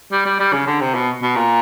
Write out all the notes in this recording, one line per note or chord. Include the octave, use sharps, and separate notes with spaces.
G3
G3
G3
C#3
D3
C3
B2
B2
A#2